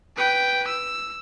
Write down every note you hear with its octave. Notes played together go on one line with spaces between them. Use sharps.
B4 G5
E6